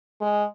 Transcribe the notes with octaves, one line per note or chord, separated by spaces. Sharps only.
G#3